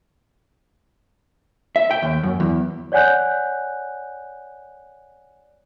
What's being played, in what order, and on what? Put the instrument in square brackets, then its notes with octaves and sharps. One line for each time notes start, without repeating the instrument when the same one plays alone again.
[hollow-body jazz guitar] E5
G5
D#2
F#2
E2
[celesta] C#5 D5 F#5 G#5 F#6 G6